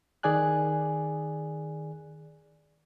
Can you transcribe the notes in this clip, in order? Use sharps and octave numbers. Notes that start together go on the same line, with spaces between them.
D#3 G#4 D5 G#5 F#6